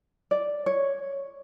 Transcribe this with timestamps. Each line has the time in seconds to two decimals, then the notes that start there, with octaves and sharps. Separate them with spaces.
0.31 D5
0.66 C#5